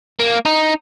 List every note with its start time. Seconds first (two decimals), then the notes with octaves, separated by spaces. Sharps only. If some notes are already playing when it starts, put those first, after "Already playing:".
0.19 A#3
0.45 D#4